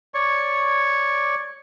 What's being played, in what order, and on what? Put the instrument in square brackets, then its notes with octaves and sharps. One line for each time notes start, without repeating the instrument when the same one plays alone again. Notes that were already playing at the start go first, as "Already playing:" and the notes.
[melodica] C#5 D5 C#6